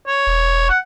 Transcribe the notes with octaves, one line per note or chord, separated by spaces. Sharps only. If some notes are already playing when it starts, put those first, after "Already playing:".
C#5
E1
F#5